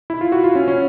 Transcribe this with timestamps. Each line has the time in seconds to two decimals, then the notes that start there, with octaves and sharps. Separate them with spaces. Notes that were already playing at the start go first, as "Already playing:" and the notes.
0.10 E4
0.21 F4
0.32 F#4
0.44 F4
0.55 C#4
0.68 C#4